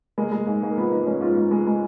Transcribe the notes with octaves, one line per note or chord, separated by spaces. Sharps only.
G#3 A#3
G#3
G#2
G#2
A#3
F3 B3
G#2 B3
G#3 C#4
G#2 F4
G#2
G#3
G#3